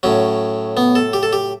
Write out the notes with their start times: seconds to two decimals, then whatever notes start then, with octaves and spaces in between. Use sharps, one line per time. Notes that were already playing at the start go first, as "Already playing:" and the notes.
0.03 A2 F#3 C#4
0.77 B3
0.95 A4
1.13 G4
1.23 A4
1.33 G4